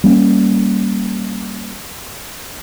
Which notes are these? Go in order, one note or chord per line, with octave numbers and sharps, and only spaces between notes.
G3 A#3 C#4